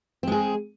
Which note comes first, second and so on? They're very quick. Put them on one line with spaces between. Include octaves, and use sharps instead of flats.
C4 G#3 G#4